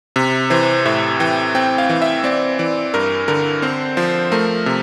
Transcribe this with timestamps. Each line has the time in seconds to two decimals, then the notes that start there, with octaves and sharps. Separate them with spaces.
0.16 C3
0.50 E3 C5
0.86 A2 E5
1.20 E3 G5
1.55 C4 G5
1.78 F5
1.90 E3
2.02 E5
2.24 C4 D5
2.59 E3 D5
2.94 G2 A#4
3.28 D3 A#4
3.62 C4 C5
3.97 F3 C5
4.32 A3 A#4
4.66 C3